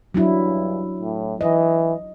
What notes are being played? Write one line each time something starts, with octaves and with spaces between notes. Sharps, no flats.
G2 F#3 D4 E4
A2
E3 D#5